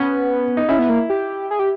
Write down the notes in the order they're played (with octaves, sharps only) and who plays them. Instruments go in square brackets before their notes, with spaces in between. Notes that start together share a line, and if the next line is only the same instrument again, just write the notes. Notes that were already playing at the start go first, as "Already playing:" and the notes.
Already playing: [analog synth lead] B3 [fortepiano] C#4
[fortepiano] D#4
[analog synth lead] C#4 [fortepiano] E4
[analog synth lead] B3
A#3
G4
G#4
G4